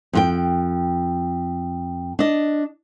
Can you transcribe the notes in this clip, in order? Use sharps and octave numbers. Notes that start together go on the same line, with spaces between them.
F2 F4 G5
D4 D#5